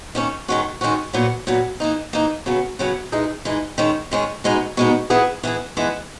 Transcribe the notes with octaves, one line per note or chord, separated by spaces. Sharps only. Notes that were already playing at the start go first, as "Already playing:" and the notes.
D#3 A#3 C#4
D#3 G#3 C#4 F#4
D#3 G#3 C#4 F#4
A#2 F#3 B3
A#2 F#3 B3
E3 A#3 D#4
E3 A#3 D#4
C#3 F#3 B3
C#3 F#3 B3
E3 G#3 D#4
E3 G#3 D#4
D#3 G#3 C#4
D#3 G#3 C#4
B2 G#3 B3 D#4
B2 G#3 B3 D#4
E3 B3 E4 G#4
E3 B3 E4 G#4
E3 G#3 B3